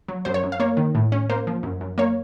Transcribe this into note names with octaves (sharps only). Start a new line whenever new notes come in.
F#3
F#2 C5
C#5
F#2
F5
A#3 C#5
D#3
A2
C#4
A#3 C5
F3
F#2
F#2
A#3 C#5